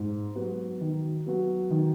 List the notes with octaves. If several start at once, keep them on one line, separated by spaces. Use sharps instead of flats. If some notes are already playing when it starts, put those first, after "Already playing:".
Already playing: G#2
F#3 B3 F#4
D#3
F#3 B3 F#4
D#3